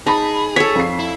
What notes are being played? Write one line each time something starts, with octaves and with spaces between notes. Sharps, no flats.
D#4 G#4 A5 B5
A4 C#5 B6
F2 C7
E4